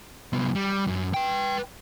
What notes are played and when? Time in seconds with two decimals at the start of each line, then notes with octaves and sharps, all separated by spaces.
0.33 C2 B3
0.55 G3
0.87 F#2
1.14 B4 G5